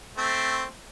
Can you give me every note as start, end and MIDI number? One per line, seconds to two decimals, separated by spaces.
0.17 0.65 57
0.17 0.65 60